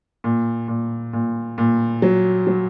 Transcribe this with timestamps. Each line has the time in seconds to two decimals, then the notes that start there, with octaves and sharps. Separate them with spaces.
0.24 A#2
0.68 A#2
1.13 A#2
1.58 A#2
2.02 F#3
2.47 F#3